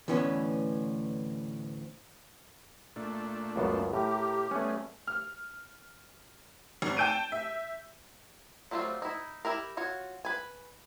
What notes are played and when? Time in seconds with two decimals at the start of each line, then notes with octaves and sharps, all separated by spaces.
0.08 D2 A2 E3 B3 C#4
2.96 A#2 A3 D4
3.56 C#2 F#2 C#3 B3
3.93 A2 G4 A#4
4.51 G3 A3 B3 C#4 G#4
5.07 F6
6.82 G#1
6.97 G5 A5 G6 D7 D#7
7.32 E5
8.71 F#3 G3 A3 C4 F4
9.02 D#4 E4
9.45 E4 G4 A#4
9.77 F4 F#4 C#5
10.25 B4 G#5